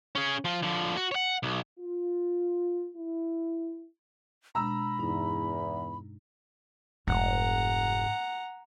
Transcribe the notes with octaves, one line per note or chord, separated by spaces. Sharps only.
C#4 G#4
F3 F4
D3 F3
F#4
C#5 F#5
B1
F4
E4
B2 G#3 D4 A#5 B5 E6
E2 G2 D#4
F1 G#2 C3 F#5 A#5